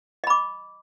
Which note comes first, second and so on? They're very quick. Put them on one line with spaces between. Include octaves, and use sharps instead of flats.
D#5 B5 D6